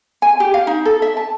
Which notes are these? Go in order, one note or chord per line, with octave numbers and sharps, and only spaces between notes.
G#5
G4
F5
D#4
A4
E5
A5